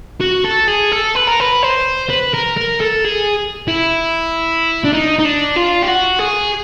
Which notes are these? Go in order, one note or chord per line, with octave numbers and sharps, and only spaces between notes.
F#4
A4
G#4
A4
B4
A#4
B4
C5
B4
A#4
A#4
A4
G#4
E4
D4
D#4
D#4
D4
F4
G4
F#4
G#4